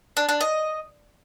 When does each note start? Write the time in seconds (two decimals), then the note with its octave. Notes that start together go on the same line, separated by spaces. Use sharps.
0.17 D4
0.29 D4
0.41 D#5